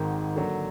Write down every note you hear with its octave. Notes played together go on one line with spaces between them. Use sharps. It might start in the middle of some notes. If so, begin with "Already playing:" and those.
Already playing: G#1 G#2 D#3
D3 F#3 A#3